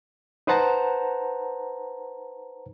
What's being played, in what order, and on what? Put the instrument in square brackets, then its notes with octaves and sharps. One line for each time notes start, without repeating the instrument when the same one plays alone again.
[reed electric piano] D#4 B4 C5 F#5 A5 A#5